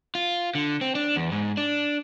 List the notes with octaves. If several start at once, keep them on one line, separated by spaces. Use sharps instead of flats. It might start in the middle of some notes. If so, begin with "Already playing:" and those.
F4
D3
C4
D4
E2
G#2
D4